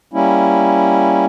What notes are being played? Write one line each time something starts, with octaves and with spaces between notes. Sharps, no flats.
G3 A#3 C#4 E4